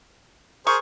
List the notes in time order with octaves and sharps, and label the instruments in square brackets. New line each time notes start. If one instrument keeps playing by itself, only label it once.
[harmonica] G#4 A#4 C5 [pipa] C#6